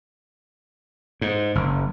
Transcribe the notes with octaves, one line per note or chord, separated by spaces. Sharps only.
G#2
F#1